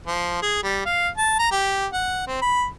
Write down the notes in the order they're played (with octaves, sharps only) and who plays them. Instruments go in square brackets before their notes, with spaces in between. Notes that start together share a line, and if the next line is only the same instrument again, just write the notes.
[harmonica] F3
G#4
G3
F5
A5
A#5
G4
F#5
C4
B5